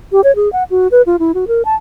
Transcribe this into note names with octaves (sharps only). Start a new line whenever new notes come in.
G4
C#5
G#4
F#5
F#4
B4
F4
E4
F#4
A#4
A5